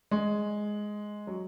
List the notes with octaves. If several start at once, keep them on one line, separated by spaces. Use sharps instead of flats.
G#3
F#3